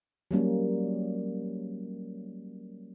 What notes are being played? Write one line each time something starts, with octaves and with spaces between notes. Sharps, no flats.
F#3 G3 A#3 C#4